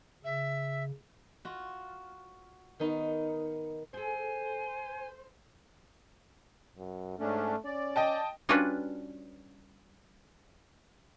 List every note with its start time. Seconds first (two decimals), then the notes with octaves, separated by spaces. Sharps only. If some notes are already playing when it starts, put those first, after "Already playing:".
0.24 C#3 E5
1.45 F4 F#4
2.80 D#3 B3 D#4
3.94 G#4 A4 C5 G#5
6.78 F#2
7.19 G#2 A3 C#4 D4
7.65 C#4 D5
7.96 D#5 G5 A5
8.49 G3 C#4 D4 F4 F#4 B4